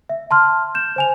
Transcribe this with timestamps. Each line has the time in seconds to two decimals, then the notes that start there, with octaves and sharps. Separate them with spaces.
0.09 E5
0.31 A5 C6 F6
0.75 G6 E7
0.96 C5 G#5 F7